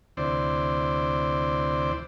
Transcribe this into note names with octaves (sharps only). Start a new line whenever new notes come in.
D2 C3 E3 C5 D5